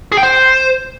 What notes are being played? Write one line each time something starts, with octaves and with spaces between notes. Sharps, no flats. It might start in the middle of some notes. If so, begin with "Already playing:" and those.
G#4
G5
C5